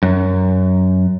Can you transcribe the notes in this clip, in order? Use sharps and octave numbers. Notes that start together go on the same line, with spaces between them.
F#2